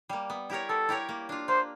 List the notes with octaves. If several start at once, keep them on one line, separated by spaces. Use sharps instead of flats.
G3 A#3
B3
E4 G4 A#4 C#5
B3 A4
E4 G4 A#4 C#5
A#3
D4 F4
A#3 C5